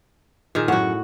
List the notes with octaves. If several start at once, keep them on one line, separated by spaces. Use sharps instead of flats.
A#2 D#3 G#4
F#2 A2 F#4 F#5